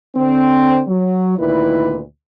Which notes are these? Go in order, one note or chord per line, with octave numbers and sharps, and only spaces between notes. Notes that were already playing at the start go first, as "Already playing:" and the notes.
D3 C4
F#3
D2 A#2 D#3 E4 B4